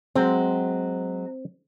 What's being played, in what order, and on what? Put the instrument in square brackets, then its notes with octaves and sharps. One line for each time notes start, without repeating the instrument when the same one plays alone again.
[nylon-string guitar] F#3 G#3 [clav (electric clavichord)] C4